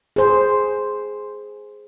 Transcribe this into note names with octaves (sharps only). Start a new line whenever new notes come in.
G#4 C5